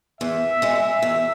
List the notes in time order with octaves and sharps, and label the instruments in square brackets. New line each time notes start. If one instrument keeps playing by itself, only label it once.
[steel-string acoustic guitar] E2 [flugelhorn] E5
[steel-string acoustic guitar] C#3 G#3
E2